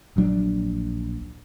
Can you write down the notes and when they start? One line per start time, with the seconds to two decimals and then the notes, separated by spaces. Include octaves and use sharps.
0.16 D1 A#1 F#3 D4